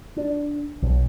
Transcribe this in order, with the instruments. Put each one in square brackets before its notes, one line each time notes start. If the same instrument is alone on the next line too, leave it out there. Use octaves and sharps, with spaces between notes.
[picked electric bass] D4
B1